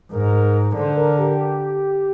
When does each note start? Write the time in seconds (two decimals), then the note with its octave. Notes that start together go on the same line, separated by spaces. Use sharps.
0.12 G#2 A#4
0.76 D3 C5
0.97 A#4
1.18 G4